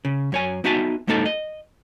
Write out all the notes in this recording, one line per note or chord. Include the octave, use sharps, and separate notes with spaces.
C#3
F#2 C#5 G#5
B3 D#4 F#4 E5 G#5 A5
F#2 G#3 A#3 D#4 A4 A5
D#5